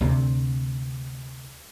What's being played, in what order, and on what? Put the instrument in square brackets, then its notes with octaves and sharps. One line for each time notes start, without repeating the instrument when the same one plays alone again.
[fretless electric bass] D2 C3